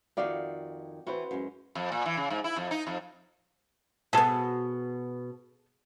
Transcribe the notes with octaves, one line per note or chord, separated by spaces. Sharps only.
F2 D#3 F#4 D5 E5 F5
E3 C4 F#4 B4 C5
F#2 G#3
F2
A#2
E3
C#3
G#2
E4
F2
D#4
F2
B2 B3 G#4 A4